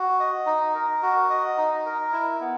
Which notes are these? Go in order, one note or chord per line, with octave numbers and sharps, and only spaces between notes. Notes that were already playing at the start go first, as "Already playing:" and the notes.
Already playing: F#4
D#5
D#4
A#4
F#4
D#5
D#4
A#4
E4
B3